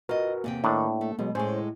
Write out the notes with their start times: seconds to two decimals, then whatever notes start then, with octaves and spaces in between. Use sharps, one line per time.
0.09 F4 F#4 A#4 B4 D#5
0.44 E2 C3 A#3 G5
0.64 A2 D#3 D4
1.01 A3
1.19 B2 F#3 G#3 B3
1.35 A2 G#3 C#4 G#4 C5 C#5